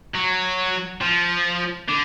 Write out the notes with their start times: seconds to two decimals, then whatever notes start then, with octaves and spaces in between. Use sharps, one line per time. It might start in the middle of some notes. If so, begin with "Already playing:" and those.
0.14 F#3
1.01 F3
1.89 D3